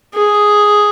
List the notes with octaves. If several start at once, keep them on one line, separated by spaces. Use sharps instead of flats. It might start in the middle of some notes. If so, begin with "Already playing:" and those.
G#4